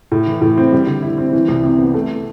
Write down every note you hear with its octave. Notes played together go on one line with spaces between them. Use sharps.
A2
E3
A2
C4
G3
D3
E4
C4
E3
C2
C3
B3
A3